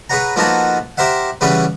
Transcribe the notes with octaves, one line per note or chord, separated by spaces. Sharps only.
G#4 B4 C#5 F#5 A#5
F3 A#3 B3 D#4 F#4 A4
G4 A#4 C5 E5 F#5
C#3 E3 G3 B3 C#4 G#4